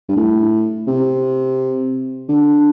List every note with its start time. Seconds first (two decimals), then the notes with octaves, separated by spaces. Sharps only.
0.09 G2
0.17 A2
0.87 C3
2.29 D3